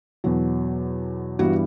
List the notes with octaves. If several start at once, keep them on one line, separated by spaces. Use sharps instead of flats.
E2 B2 F#3
G2 E3 G3 B3 F#4